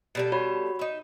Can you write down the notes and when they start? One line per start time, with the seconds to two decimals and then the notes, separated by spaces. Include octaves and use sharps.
0.15 B2 G3 A4
0.32 F#4 C#5 B5
0.79 D#4 E5